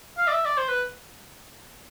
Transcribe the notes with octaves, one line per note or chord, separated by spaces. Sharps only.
F5
D5
E5
D5
C5
B4